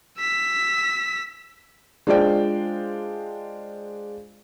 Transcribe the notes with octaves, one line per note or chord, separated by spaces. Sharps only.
E6 B6
G#3 D4 F4 C5 D5 G5